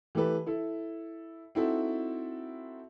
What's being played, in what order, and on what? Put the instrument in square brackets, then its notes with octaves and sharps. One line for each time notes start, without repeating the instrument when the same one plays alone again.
[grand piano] E3 A3 G4 A4 B4
E4 A4
C4 D#4 E4 F#4 A4